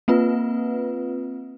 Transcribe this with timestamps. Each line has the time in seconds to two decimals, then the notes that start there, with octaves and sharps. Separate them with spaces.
0.08 A#3 C4 F4 B4